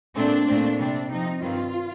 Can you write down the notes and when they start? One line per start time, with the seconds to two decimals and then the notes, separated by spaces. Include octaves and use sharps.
0.15 A#2 A3 C4 D4
0.47 A#2 A3 C4
0.78 C3 G3 C4 D4
1.09 C3 F3 C4 D#4
1.41 G2 D#3 G3 C4 F4